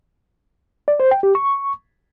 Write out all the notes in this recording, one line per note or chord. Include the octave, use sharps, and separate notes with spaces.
D5
C5
G5
G4
C#6